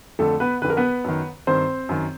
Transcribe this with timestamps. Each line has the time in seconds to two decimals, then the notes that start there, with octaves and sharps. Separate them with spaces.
0.19 F2 D3 A3 A4
0.40 B3 B4
0.62 F2 D3 B4
0.70 A#4
0.77 B3 B4
1.04 F#2 D#3
1.47 G2 D#3 C4 C5
1.89 F#2 D#3